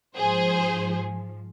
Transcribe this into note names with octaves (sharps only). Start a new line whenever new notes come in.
G#2 F3 G#4 C5